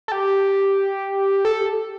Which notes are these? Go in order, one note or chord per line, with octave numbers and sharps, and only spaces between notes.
A4
G4
A4